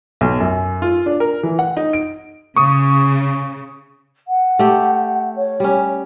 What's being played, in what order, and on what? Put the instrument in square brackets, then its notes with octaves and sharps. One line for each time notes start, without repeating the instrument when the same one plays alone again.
[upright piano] B1
F#2
F4
D4
A#4
E3
F#5
D#4
D7
[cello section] C#3 [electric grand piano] C#6 D#6
[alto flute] F#5
[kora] A3 G4
[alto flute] C#5
[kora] G3 C#4